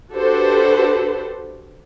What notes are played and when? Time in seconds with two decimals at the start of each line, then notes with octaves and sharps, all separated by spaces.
0.13 D4 F#4 G4 A4 B4 C5